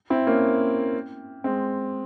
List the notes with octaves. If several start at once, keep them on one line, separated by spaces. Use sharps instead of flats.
C4 E4
A#3 C#4
G#3 C4